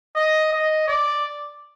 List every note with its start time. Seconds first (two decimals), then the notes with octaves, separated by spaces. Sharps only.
0.15 D#5
0.52 D#5
0.88 D5